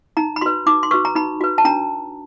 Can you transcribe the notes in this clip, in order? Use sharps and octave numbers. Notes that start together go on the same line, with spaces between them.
D#4 A#5
B5
F#4 B4 C6
D#4 D6
C6
F#4 B4 C#6
A#5
D#4 B5
F#4 B4
A5
D4 A#5